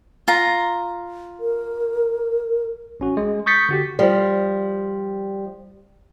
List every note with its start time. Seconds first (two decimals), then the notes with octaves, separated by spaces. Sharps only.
0.28 F4 A#5
1.40 A#4
3.00 A1 C#4 F#4
3.17 G#3
3.46 C#6 D#6 G6 A6 B6 C#7
3.69 D3 F#4 G4
3.99 F3 G3